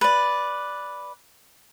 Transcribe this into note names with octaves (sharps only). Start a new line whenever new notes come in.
B4 D5